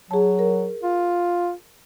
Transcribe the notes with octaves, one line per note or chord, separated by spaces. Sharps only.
F#3 G#4 A5
A#4
F4